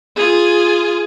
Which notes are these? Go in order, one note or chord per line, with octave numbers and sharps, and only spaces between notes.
F4 G#4